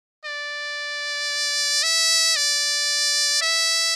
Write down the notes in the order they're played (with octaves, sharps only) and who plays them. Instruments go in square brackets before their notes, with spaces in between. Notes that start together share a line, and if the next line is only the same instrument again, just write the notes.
[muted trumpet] D5
E5
D5
E5